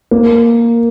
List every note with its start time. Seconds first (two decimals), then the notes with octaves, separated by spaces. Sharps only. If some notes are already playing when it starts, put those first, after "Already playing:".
0.11 A#3